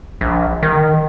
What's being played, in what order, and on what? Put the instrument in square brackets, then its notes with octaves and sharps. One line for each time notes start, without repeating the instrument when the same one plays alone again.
[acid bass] A#1
D#3